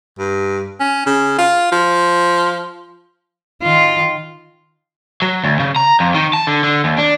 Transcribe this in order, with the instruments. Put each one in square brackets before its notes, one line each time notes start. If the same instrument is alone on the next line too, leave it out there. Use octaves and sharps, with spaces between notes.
[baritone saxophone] G2
C#4
C#3
F4
F3
[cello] D#3 F4
[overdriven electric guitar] F#3
D2
C#3
A#5
F2
D#3
A5
D3
D3
D#2
D4